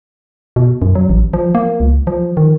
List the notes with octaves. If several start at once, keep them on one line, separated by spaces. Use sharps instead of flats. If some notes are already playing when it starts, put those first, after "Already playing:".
B2
F#2
F#3
A1
F3
A#3
C#2
F3
D#3